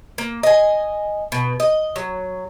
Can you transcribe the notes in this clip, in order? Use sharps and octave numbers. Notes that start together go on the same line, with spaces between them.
A#3
D#5 G#5
B2
D#5
F#3